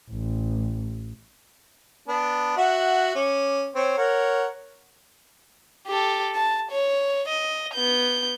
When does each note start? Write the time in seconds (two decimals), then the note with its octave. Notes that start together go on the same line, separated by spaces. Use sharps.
0.11 A1
2.08 B3 D4
2.57 F#4 E5 F#5
3.16 C#4 D6
3.75 C4 C#5
3.98 A#4 C#5 F#5
5.88 G4 A4
6.35 A5
6.71 C#5
7.28 D#5
7.74 B3 G6